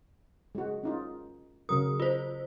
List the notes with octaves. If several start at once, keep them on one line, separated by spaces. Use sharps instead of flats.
G#3 F#4
C#4 D#4 F4
C#3 F#3 A#4 D#6
F4 C5